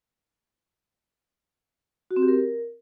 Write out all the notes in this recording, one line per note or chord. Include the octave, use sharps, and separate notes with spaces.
F#4
C4
G4
A#4